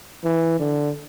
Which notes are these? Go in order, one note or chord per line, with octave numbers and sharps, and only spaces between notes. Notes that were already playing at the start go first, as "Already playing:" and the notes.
E3
D3